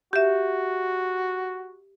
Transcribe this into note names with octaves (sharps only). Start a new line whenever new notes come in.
F#4 G4 E5